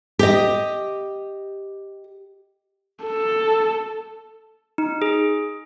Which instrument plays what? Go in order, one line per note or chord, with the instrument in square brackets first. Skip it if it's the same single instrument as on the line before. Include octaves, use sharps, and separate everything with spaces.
[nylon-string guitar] G4 D#5
[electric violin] A4
[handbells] D#4
G#4